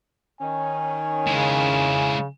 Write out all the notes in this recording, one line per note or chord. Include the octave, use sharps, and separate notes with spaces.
D#3 C#4 G#5
C#3 G#3 E4